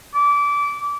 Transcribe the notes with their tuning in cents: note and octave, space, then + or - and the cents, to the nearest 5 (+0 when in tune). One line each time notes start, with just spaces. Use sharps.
D6 -25